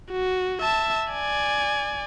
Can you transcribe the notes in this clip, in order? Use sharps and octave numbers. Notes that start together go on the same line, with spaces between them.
F#4
E5 A5
D5 G#5